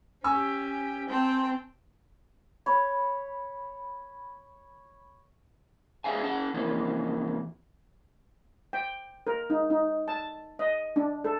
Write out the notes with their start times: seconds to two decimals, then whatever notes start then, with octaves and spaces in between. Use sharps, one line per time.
0.24 C#4 G4 G#5 C#6 E6
1.09 C4 G5 A5
2.66 C#5 B5
6.04 G#4 A#4 B4 E5 F5 G#5
6.23 C#4 F#5 A5
6.54 C3 E3 F3 A#3 C#4
8.73 G5
9.27 A#4
9.50 D#4
9.70 D#4
10.08 A5
10.59 D#5
10.96 D4
11.24 A4